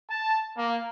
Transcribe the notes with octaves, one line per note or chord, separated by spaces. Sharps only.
A5
A#3